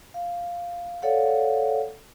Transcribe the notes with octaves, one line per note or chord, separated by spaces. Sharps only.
F5
A4 C#5 D5 F5 F#5